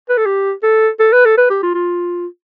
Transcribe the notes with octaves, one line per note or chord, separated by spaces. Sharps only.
B4
A4
G4
A4
A4
B4
A4
B4
G4
F4
F4